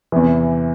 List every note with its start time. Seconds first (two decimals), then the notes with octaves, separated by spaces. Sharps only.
0.12 E2 C3 E3